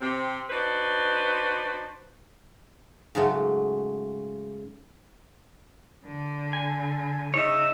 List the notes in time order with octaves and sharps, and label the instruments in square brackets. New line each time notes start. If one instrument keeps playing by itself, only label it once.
[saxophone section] C3 C4
D4 D#4 F#4 B4 C5
[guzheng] G#2 C#3 F#3 A3
[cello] D3
[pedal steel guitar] G#5
[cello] C#3 D#4 [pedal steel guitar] C#5 E5